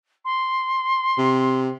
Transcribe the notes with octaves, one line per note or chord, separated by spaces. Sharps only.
C6
C3